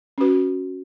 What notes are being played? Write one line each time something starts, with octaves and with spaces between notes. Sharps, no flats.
C#4 F#4 B4